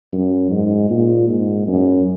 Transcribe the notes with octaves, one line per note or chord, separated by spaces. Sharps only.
F#2
G#2
A#2
G#2
F#2